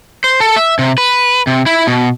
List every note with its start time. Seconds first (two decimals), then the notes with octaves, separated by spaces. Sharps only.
0.24 C5
0.40 A4
0.56 E5
0.79 C3
0.98 B4
1.47 C3
1.66 E4
1.87 B2